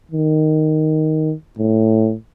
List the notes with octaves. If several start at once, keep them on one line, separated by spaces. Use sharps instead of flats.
D#3
A2